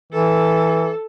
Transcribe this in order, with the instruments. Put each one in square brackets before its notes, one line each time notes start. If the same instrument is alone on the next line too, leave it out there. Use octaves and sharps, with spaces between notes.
[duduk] E3 [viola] A4